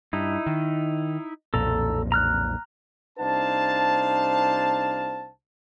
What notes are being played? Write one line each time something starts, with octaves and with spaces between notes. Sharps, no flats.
G2 D#4 E4
D#3
B1 F2 A#2 A4 A#5
A#5 F6 F#6
C2 D4 D#4 C5 F5 A5